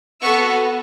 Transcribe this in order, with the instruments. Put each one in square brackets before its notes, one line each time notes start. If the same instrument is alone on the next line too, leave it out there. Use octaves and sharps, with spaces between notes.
[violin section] B3 F#4 A4 C#6 E6